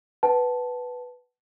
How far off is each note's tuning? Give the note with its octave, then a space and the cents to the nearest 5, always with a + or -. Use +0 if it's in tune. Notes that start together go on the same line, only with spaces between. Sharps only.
B4 +0 F#5 +40 A5 -10